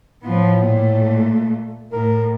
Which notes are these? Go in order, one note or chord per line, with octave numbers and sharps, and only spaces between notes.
A2 F3 B3
A#2 A3
A2 A#4